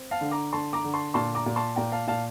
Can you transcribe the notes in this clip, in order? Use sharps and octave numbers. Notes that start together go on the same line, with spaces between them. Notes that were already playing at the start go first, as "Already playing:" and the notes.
Already playing: C4
F5 A5
D3
A#5 D6
D3 A5 C6
A#5 D6
D3
A5 C6
A#2 A5 C6
A#5 D6
A#2
A5 C6
A#2 G5 A#5
F5 A5
A#2 F5 A5